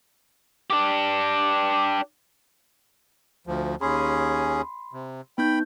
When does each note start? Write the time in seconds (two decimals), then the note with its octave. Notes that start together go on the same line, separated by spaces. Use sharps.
0.70 D4 G4
3.47 D2 F3
3.81 D#2 C#4 G#4 B5 C6
4.93 C3
5.38 B3 D#4 G5 B5 G6